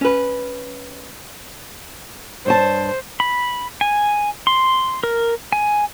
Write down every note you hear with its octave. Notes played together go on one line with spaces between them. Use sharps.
C#4 B4
G2 C5 C#5 A5
B5
G#5
C6
A#4
G#5